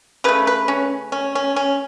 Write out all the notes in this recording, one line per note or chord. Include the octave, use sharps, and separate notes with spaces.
C#3 A3 B4
B4
C#4
C#4
C#4
C#4